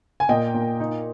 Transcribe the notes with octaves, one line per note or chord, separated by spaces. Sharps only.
G#5
A#2 D#5 G5
A#2
D#4